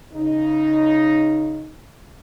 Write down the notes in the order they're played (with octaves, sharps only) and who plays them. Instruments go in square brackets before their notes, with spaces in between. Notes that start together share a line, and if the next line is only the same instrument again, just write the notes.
[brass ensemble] C#3 D#4